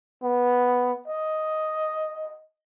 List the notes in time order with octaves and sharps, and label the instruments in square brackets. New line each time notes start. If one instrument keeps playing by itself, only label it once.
[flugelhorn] B3
D#5